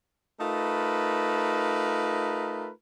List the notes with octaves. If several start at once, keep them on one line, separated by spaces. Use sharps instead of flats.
A3 D#4 F4 A#4 B4